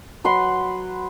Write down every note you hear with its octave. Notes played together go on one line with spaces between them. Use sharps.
F#3 B4 F#5 C6